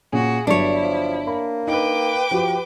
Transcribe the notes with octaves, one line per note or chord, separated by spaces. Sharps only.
A#2 C#4 F#4 G#4
G1 G2 F#3 D4 E4 C#5
F3
A#3 B5
D#4 B4 D#5 G5 D6
F3 F#4 G4